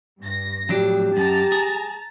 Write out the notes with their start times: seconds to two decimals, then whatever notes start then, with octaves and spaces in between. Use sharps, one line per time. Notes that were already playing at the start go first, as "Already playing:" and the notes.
0.20 G2 A#6
0.69 F2 A2 F#3 D4 G4
1.17 F#2 A5 A#5
1.52 G#4